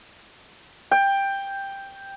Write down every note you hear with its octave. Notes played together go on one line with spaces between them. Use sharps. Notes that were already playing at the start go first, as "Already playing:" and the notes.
G5